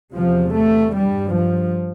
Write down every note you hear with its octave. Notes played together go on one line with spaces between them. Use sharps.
E2 C3 F3
A3
G2 G3
F3